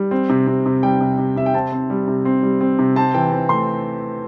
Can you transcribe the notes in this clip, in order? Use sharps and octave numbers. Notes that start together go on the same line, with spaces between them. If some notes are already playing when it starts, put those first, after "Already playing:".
Already playing: G3
C4
C3
C3
C3
G3 G5
C3
C3
C3 E5
G5
C4 A5
C4
G3
C3
C4
G3
C4
C3
C4 A5
E3 G5
C4
A3 C6